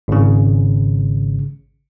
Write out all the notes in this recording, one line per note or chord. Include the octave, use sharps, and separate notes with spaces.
G#1 C#3